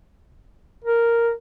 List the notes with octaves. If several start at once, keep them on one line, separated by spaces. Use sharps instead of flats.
A#4